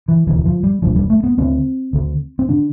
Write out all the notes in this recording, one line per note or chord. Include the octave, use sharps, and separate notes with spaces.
E3
E1 D2 D3 E3
F3
G3
E1 D2 D3 F3
G3
A3
B3
D2 D3 C4
D2 D3
C4
D3 D4